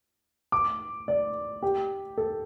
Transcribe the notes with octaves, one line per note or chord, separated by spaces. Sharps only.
D6
D5
G4
A4